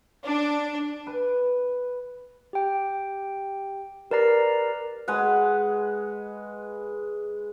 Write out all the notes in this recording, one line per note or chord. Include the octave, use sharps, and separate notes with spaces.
D4
B4
G4 G5
G4 A#4 B4 D5 A#5 C7
G#3 B4 F#5